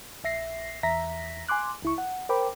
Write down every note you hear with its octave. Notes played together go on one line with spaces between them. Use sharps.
A#1 E5 A#6 C7
E2 E5 A#5 A#6 B6
G#5 C6 D6 F#6
C#2 E4 C#6
F#5
A#4 C5 G5 B5 D6